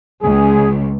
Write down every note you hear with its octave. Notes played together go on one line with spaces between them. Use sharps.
C#2 G#4